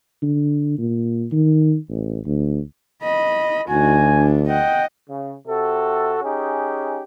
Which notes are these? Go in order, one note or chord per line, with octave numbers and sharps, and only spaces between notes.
D3
A#2
D#3
A1
D2
D#5 B5
D2 D#4 F#4 G#5
D4
D#5 F#5 G5
C#3
C3 F#4 A4
C#4 D#4 G4 G#4